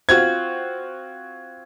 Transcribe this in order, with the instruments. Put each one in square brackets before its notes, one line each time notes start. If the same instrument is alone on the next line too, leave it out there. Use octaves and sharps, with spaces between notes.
[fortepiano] C4 F4 F#4 [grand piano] G#6